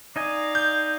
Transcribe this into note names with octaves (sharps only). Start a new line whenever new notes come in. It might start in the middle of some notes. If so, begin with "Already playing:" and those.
D#4 D5 D#5 F5 G#5
G6